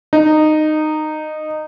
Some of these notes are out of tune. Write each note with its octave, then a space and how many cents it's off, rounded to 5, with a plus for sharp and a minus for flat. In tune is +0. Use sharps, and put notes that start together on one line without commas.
D#4 -15